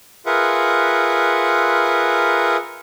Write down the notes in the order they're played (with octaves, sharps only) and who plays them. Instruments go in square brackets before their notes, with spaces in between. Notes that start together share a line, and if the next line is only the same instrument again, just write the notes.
[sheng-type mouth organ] F4 G#4 A#4 B4 E5 F#5